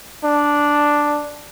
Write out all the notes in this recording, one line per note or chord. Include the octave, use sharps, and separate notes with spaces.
D4